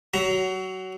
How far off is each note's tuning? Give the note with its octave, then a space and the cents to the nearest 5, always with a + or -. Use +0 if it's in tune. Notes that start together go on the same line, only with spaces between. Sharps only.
F#3 +20 A#5 +0